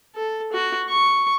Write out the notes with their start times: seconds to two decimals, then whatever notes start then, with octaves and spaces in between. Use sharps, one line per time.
0.15 A4
0.53 F#4
0.89 C#6